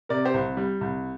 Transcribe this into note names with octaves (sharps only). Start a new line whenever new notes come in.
C3 A#4 D5
G4 C5
C2
G3
C2